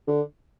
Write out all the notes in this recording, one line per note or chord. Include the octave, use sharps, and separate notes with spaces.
D3